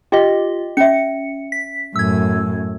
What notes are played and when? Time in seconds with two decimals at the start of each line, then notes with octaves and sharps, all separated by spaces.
0.12 F4 G4 D#5 G5
0.77 C#4 E5 C#7
1.52 B6
1.96 F#2 A2 E6 G#6